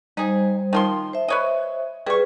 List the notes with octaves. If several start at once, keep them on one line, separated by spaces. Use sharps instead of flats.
G3 D#4 G#4 C5
D#3 F3 C6
C5 E5
B4 C#5 D#5
G3 G#4 B4 C#6